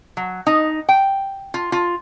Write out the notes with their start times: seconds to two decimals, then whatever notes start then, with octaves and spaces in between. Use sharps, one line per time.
0.17 F#3
0.47 D#4
0.89 G5
1.54 F4
1.72 F4